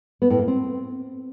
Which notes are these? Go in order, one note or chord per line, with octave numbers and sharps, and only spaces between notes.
B3
A2
A#3
C4